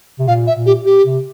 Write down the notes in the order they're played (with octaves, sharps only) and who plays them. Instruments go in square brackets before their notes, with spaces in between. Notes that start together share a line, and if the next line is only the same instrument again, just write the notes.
[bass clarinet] C3
[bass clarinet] A#2 [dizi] F5
[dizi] E5
[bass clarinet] A#2
[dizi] G4
G4
[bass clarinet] C3